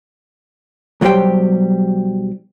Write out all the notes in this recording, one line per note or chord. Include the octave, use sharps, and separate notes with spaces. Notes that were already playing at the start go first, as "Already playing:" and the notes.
B1 F#3 G3 G4 C5 G5